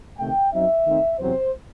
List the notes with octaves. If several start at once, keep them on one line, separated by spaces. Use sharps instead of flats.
C3 D#3 A3 G5
F#2 F#3 C4 D#4 E5
D#3 A3 C4 D#4
E2 C3 F#3 C4 C5